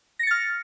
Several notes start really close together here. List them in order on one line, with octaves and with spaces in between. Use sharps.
A#6 C#7 A6 F6